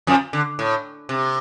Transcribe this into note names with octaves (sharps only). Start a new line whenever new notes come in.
F2 F3
D3
A2
C3